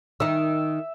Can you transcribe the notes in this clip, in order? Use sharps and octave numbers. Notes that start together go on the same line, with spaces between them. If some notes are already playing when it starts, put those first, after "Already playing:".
D#3 D#4 E5